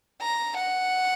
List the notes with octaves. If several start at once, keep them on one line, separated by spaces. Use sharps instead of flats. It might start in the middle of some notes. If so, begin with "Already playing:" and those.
A#5
F#5